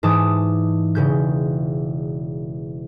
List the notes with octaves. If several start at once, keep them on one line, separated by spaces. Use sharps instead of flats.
G#2 E3 A5 D6 D#6
E1 C#3 G6